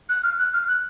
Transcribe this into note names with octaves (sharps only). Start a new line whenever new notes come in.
F#6
F6
F#6
F6
F#6